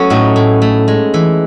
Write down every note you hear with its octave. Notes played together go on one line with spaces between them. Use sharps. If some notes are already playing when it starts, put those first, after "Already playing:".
Already playing: F#3 A3 B3 C#4
A2 D#4 F#4
A2
A3
G#3
E3